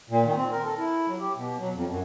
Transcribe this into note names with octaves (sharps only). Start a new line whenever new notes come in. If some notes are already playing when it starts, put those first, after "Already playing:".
A#2
D#3
C4
A#4
A4
E4
F#3
G4
B2
F#3
F2
F#2